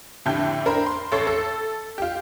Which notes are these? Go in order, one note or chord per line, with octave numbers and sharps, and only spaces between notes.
F2 A2 D3 G4 G6
D4 A#4 C5 B5 C6
C6
A1 A4 C#5 C7
A4
F4 G4